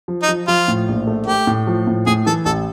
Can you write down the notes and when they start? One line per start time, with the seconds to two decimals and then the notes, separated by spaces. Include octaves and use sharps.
0.08 F3
0.22 D#4
0.29 F3
0.48 F3 F4
0.68 A2
0.88 A#1
1.07 A3
1.27 A3 G4
1.47 A2
1.67 F3
1.87 A2
2.07 A2 G#4
2.26 E3 A4
2.45 A1 A4